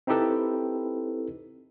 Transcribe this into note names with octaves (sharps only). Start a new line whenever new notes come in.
C4 D#4 E4 G4 A4 B4